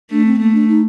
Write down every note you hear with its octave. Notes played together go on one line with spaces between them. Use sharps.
A3 D4
C4
A3 A#3
D4
D#4